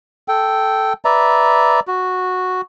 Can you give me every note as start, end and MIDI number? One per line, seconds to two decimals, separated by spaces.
0.28 0.93 69
0.28 0.93 79
1.05 1.80 71
1.05 1.80 74
1.05 1.80 76
1.05 1.80 82
1.87 2.61 66